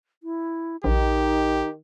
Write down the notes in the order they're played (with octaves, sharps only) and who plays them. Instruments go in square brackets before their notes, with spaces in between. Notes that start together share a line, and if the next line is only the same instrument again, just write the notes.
[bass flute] E4
[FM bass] A#1 [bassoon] D#3 [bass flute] D#4 [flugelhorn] G4